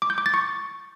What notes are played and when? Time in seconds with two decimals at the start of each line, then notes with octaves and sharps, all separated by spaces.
0.02 D6
0.10 G6
0.18 D6
0.26 A6
0.34 C#6